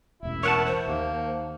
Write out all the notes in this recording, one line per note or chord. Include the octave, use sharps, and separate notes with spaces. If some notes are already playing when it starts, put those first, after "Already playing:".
E1 A1 E4
A#4 C#5 F#5 A5
C5
D#2 A#3